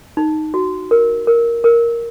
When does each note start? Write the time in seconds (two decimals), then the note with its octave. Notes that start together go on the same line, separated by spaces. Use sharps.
0.17 D#4
0.54 F#4
0.91 A#4
1.27 A#4
1.64 A#4